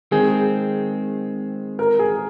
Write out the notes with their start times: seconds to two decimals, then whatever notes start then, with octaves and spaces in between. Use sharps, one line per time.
0.11 D#3 G#3 C4 G#4
1.79 A#4
1.99 G#4